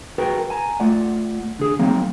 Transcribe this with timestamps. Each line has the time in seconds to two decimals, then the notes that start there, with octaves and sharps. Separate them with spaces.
0.18 F#4 G#4 A#4 B4 G5
0.50 G#5 A#5
0.80 A3 F4 D5 F#5
1.59 D3 G#4
1.79 F#3 A#3 C4 A#5